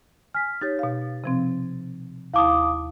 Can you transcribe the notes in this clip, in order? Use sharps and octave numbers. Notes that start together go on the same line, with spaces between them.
G#5 F6 B6
D#4 G4 C#5 A6
B2 F5
C3 F3 C4
D#2 E4 F5 A5 D6 D#6